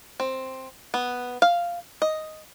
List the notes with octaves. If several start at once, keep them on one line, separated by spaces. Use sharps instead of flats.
C4
B3
F5
D#5